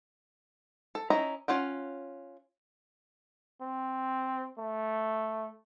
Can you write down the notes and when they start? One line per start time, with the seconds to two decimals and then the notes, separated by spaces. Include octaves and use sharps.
0.95 A4
1.10 C#4 D#4 E4 A#5
1.48 C#4 F4 F#5 G5
3.62 C4
4.58 A3